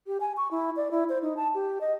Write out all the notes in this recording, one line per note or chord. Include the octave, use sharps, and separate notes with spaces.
G4
G#5
C#6
E4
D5
E4
C5
D#4
A5
G4
D#5